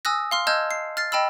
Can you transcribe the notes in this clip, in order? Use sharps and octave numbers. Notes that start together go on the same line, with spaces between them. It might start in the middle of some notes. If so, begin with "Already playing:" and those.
G#5 D#6 E6 F#6 A#6
F5 C6 F6
D#5 A5 E6 F6 G6 G#6
C7
F6 A6 C7
D#5 G5 A5 B5 E6